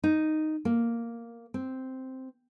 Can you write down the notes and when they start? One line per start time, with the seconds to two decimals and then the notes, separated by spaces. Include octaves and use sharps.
0.04 D#4
0.65 A#3
1.54 C4